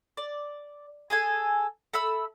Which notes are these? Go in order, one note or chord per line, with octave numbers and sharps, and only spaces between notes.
D5
G#4 A4 G#5
A4 E5 B5 E6